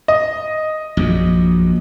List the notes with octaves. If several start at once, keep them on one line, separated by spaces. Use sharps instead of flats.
D#5
A#1 F#2